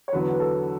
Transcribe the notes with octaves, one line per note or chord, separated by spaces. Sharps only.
C#5
E2 D3 F#3 B3 B4
B4
A4